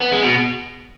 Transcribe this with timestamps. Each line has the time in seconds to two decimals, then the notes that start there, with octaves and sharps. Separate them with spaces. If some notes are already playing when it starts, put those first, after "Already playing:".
0.02 B3
0.12 G#3
0.23 B2